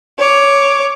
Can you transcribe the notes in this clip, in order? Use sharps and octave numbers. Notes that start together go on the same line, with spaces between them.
C#5 D6